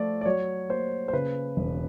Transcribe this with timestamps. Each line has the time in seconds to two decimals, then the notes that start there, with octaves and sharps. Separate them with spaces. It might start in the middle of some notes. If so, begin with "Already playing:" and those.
Already playing: F3 A3 D5
0.21 D5
0.26 F#3 C#5
0.69 A#3 C5
1.08 C5
1.13 C#3 B4
1.57 E1